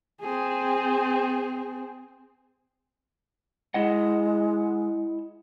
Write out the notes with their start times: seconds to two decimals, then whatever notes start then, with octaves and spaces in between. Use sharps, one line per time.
0.21 C4 G#4
3.74 G#3 E4 D#5 F#5